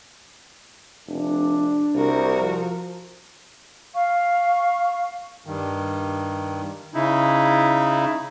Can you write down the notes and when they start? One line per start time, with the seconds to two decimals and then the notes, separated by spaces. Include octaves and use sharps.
1.07 F1 D4
1.95 C2 F#4 A#4
2.38 F3
3.94 F5 C#6
5.46 G2 D#3
6.94 C#3 D#4 E4